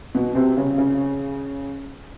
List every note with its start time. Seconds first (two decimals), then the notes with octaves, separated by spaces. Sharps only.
0.15 B2 B3
0.35 C3 C4
0.57 C#3 C#4
0.78 C#3 C#4